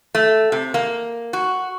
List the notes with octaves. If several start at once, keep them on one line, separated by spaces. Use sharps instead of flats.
A3
C3
A#3
F#4